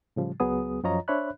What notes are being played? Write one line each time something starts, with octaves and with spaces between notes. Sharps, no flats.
A2 C#3 F3 G3
C#2 F#3 B3 G#4 D#6
F#2 F3 F4 C#5 D#5 A#5
D4 C5 C#5 E5 B5 F#6